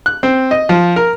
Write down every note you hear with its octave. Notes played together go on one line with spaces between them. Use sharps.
F#6
C4
D#5
F3
A#4